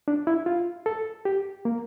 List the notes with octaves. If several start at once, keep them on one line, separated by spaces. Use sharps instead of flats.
D4
E4
F4
A4
G4
A#3